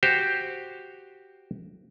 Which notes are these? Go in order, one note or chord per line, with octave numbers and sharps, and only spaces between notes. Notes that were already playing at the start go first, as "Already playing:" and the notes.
F#4 G4 C5